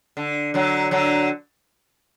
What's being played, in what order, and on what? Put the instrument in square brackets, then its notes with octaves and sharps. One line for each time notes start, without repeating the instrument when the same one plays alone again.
[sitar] D3
D3 F#3
D3 F#3